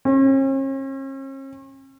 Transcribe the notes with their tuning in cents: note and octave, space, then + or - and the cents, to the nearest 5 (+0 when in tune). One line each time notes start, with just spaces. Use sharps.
C#4 -45